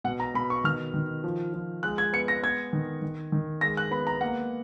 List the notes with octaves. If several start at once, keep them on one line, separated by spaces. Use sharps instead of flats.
B2 F#5
A#5
B2 B5
C#6
D#3 F6
D#3
F3
F3
G#3 F#6
G#6
B3 C#7
A#6
B3 G#6
D#3
D#3
D#3
G#3 A#6
F#6
B3 B5
A#5
A#3 F#5